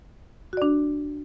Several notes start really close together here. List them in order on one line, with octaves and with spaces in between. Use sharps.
F#4 D5 D4